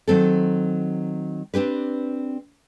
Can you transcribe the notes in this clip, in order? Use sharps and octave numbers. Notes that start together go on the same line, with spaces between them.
D#3 F#3 C4 A4
C4 D4 G4 B4